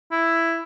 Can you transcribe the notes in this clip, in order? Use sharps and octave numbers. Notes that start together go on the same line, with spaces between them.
E4